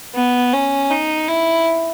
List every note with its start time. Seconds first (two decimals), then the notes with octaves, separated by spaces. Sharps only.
0.15 B3
0.53 C#4
0.91 D#4
1.29 E4